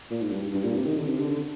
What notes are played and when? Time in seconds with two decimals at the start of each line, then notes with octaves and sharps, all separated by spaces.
0.11 A#2
0.21 G#2
0.32 G2
0.54 G2
0.64 A#2
0.75 C3
0.86 D#3
0.98 D3
1.09 C3
1.20 D3
1.31 D3